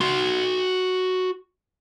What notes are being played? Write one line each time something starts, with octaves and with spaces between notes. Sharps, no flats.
F#4 C6